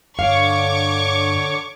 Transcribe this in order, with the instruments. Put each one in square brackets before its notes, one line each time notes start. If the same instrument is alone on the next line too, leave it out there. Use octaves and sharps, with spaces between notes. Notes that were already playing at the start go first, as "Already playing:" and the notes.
[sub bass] G2 [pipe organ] D3 C#5 [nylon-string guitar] F5 [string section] C#6 D6